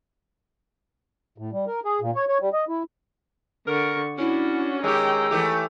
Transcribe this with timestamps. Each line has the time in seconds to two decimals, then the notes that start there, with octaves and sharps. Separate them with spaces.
1.38 A2
1.52 G3
1.67 A#4
1.85 G#4
2.01 A#2
2.15 C#5
2.28 C#5
2.41 G3
2.53 D#5
2.68 E4
3.67 D3 A#4 C#6
4.19 C#4 D4 E4 F#4
4.84 D#3 G#3 C#4 G4 G5 A#5 E6
5.31 E3 A3 G4